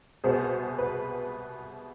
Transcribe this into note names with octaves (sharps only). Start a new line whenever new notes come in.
C2 B2 B3 G#4 C5
B4